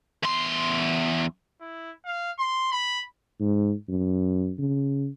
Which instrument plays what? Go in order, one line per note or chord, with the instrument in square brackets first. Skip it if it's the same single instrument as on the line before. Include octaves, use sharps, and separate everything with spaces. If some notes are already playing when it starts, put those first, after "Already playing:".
[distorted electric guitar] E2 C6
[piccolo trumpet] E4
F5
C6
B5
[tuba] G#2
F#2
C#3